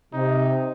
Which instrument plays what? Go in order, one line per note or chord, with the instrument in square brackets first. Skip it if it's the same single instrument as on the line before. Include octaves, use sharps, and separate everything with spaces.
[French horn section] C3 [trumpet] D#4